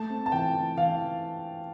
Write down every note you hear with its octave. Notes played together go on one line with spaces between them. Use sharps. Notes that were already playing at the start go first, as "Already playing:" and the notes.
Already playing: A3 A5
C4
A5
E3 G5
E3
E3 F5